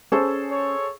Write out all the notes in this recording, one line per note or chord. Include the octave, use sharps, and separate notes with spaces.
C#4 G#4 A4 C5
C#5